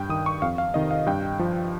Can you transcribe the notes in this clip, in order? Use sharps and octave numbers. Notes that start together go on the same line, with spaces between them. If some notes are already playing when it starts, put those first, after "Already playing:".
Already playing: G2 G5
D#3 D#6
C#6
F2 F5
F5
C3 D#3 D#5
F5
G2 G5
F3